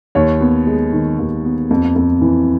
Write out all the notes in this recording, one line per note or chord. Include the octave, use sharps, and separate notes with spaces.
D#2 C#5
B3
G#3
D#3
D#2
B3
F2
F2
E3